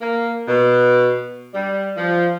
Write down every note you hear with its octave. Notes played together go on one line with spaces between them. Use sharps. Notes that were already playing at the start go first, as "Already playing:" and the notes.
A#3
B2
G3
F3